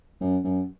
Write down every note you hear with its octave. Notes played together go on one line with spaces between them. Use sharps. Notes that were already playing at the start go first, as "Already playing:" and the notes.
F#2
F#2